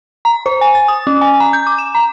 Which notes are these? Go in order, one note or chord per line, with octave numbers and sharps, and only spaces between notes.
A#5
C5
G#5
A6
D#6
C#4
G#5
A#5
G6
D6
E7
A#5